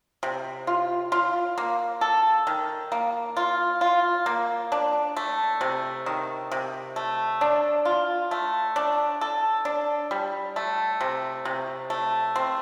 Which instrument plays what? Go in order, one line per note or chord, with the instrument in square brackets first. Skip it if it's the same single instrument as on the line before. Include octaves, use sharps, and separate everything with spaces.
[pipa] C3
F4
F4
A#3
A4
D#3
A#3
F4
F4
A#3
D4
A3
C3
D#3
C3
A3
D4
F4
A3
D4
A4
D4
G3
A3
C3
C3
A3
C4